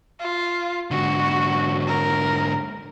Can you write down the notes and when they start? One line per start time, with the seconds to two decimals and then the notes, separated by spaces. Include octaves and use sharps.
0.20 F4
0.91 G#2 D3 F#4
1.87 A#4